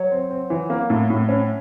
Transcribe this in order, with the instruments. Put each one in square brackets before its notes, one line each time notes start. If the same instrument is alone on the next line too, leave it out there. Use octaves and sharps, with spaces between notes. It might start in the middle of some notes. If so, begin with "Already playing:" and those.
Already playing: [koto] F#3
[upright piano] C4
C4
E3
A#3
A2
A2
C#4